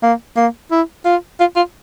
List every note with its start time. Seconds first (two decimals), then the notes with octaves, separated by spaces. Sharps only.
0.03 A#3
0.37 A#3
0.71 E4
1.05 F4
1.40 F4
1.57 F4